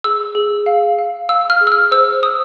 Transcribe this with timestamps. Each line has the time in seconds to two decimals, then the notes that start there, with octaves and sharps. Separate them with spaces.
0.04 G#4 E6
0.35 G#4
0.66 F5
0.99 F5
1.29 F5 E6
1.50 F6
1.61 G#4
1.67 E6
1.72 F6
1.91 C5 E6
2.23 C5 D#6